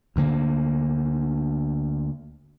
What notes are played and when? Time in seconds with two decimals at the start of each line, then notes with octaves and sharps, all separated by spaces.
0.16 D2 D3 A#3